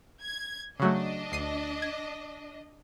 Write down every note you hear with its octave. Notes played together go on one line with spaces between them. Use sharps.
G#6
C#3 F#3 A3 D4 D#5
D2 C7 D#7
G#6